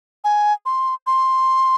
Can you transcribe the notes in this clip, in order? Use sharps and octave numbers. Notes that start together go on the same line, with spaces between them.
G#5
C6
C6